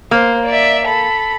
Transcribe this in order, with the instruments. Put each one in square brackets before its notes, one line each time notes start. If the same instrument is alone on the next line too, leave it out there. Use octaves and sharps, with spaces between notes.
[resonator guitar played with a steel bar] A#3 [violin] C5
[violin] D5 E5
A4 B5